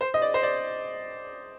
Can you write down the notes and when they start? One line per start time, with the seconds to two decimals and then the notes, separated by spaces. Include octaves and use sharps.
0.01 C5
0.14 D#5
0.22 D5
0.34 C5
0.43 D5